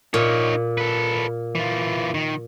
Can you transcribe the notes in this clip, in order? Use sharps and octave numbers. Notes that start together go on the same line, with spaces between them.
A#2 D#4 C#5
A4 B4
E3 F4
D#3